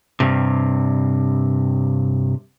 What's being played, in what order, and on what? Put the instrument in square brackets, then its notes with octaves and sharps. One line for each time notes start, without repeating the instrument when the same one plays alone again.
[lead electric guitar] G2 C3